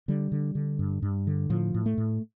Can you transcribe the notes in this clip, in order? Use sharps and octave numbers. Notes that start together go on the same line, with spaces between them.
D3 G3
D3
D3
G2
G2
D3
A2 F3
A2
A3
A2